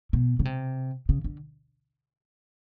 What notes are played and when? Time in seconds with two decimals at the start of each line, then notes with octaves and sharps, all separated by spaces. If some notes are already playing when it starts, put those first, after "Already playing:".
0.13 B2
0.39 C#3
0.45 C3
1.09 C#3
1.24 D3